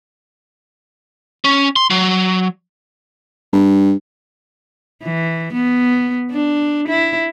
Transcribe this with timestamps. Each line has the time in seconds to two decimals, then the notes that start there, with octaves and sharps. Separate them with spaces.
1.44 C#4
1.76 C6
1.90 F#3
3.53 G2
5.03 E3
5.53 B3
6.31 D4
6.88 E4